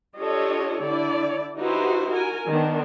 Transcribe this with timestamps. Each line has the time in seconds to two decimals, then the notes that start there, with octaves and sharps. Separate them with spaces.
0.18 D4 F4 G4 A4 C#5 D#5
0.81 D3 E4 D5
1.59 D#4 E4 F#4 G4 B4 C5
2.10 F#4 A#4 G#5
2.48 D#3 B3 D4